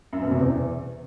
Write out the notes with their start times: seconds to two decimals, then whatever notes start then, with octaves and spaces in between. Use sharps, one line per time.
0.13 F#2
0.22 B2
0.31 C3
0.41 E2